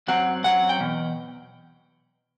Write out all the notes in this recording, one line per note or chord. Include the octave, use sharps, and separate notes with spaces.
F#2 F#3 C4 F#5
F#2 F#3 C4 F#5
G5
E2 B2